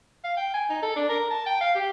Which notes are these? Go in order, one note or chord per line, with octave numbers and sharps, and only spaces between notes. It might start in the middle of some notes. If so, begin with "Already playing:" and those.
F5
G5
G#5
D#4
A4
D4
A#4
A5
G5
F5
G4